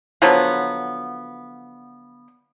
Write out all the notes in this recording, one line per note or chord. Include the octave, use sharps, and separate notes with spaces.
D3 F3 F#3 B3